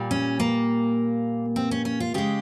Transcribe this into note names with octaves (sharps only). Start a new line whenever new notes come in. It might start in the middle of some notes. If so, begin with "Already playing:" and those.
Already playing: A#2 G3
C#4
A#3
C4
C#4
C#4
F4
C#3 G#3 G4